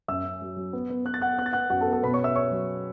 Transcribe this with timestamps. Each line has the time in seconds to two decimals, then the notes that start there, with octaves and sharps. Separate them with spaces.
0.08 F#2 E5 E6
0.24 C#4
0.41 F#3
0.56 F#3
0.73 B3
0.90 B3
1.05 B3 F#6
1.14 A6
1.21 B3 F#5 F#6
1.38 B3 F#6
1.46 A6
1.53 B3 F#5 F#6
1.70 F#2 F#4 F#5
1.81 A4 A5
1.87 B3
1.92 A4 A5
2.03 B2 B4 B5
2.13 C#5 C#6
2.20 C#4 E5 E6
2.35 C#4 C#5 C#6
2.51 F#3